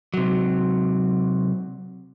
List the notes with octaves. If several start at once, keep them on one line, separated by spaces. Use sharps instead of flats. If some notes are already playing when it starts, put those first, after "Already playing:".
C3 F#3